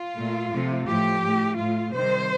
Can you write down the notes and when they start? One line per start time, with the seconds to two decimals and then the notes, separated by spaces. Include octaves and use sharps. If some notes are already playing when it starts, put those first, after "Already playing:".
Already playing: F4
0.16 A#2 A3
0.51 C3 F3 A3
0.86 A2 F3 A3 G4
1.22 A2 A3
1.57 A2 A3 F4
1.93 C3 D#3 G3 C5